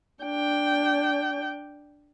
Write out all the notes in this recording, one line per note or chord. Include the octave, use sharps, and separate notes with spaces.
D4 G5